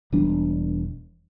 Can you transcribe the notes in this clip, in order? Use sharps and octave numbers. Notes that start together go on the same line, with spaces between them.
E1 E3 G3 D4